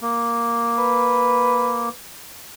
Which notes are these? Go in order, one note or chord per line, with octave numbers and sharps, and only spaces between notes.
A#3
B4